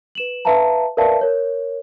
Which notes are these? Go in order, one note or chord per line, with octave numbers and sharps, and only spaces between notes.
B4 E7 F#7
B4 E5 F5 A5 A#5
A#4 B4 D5 E5 F5 A5
A#4 C#5